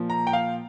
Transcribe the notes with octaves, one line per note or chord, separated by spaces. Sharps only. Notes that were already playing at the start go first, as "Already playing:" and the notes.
Already playing: A#2 F3
A#5
G5
F5